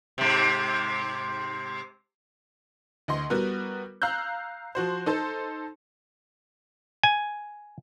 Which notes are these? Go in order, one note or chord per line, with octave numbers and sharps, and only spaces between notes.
G#2 C3
D2 D#5 C6
G3 B3 F#4 A#4
F5 A#5 E6 F#6 G6
F3 F#4 C5
D#4 A4 C5
G#5